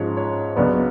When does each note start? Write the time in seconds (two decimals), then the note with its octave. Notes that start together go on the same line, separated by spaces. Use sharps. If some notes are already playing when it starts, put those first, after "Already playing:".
Already playing: G#2 F3 G#3 C#4 C#5
0.17 C#5
0.56 C#2 C#3 F#3 B3 D4 D5